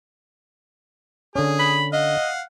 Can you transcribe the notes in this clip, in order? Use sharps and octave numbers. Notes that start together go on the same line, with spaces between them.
D3 C#4 G#4
B5
D#5 F5 F#5